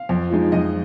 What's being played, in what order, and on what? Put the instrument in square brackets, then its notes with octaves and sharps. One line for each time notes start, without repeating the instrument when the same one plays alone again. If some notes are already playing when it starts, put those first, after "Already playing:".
Already playing: [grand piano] F5
F2
F3 G#3 D#4
F2 D#5